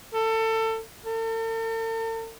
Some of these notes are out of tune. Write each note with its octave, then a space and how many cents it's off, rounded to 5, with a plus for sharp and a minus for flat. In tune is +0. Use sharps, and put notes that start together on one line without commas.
A4 +25
A4 +45